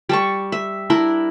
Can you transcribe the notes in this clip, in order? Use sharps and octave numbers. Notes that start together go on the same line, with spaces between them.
G3 A5 C#6
E5
D4 E4 A#4